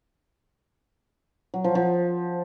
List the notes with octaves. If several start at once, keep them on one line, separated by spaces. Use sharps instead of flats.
F#3
F3
F3